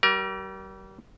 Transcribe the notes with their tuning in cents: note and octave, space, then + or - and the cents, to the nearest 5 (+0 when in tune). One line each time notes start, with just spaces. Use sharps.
G3 -35 A#4 +25